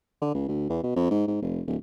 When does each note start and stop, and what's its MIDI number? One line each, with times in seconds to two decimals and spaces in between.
0.22 0.30 50
0.34 0.46 37
0.48 0.68 38
0.70 0.82 40
0.83 0.94 47
0.96 1.10 41
1.11 1.24 44
1.27 1.37 44
1.42 1.62 29
1.67 1.76 26